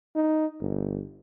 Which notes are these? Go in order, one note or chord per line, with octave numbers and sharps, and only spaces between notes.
D#4
G1